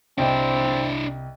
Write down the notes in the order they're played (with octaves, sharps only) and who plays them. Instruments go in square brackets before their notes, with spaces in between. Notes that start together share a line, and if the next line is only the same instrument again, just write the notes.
[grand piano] C2 D#5 G5 [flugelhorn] C4 [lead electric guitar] D4 E4